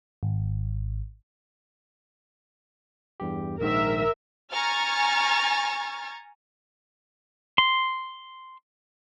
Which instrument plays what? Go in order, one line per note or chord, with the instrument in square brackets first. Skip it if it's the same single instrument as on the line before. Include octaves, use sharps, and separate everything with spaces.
[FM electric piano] G#1
[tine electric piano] E2 G2 G4
[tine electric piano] A#1 G#2 D#3 [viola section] A#4 E5
[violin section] G#5 A#5 C#6 F6 G#6 A6
[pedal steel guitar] C6